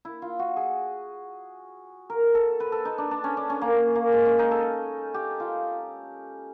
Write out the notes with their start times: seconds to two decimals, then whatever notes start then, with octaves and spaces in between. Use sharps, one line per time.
0.05 E4
0.22 F4
0.39 F#4
0.57 G#4
2.10 A#4
2.35 A4
2.60 B4
2.72 A4
2.85 D#4
2.98 D4
3.11 D4
3.24 C#4
3.37 D4
3.50 C#4
3.61 A#3
3.95 A#3
4.13 G#3
4.26 C#4
4.39 D#4
4.51 A4
5.14 G4
5.40 F4